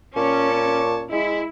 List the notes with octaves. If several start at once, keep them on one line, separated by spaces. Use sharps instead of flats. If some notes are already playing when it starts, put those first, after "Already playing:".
A#2 C#4 C#5 A5 D6
G#3 E4